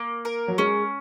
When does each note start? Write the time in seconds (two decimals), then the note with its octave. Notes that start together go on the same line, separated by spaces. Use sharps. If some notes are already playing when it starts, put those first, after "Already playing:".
Already playing: A#3
0.25 A#4
0.48 F#3
0.58 G#3 C#4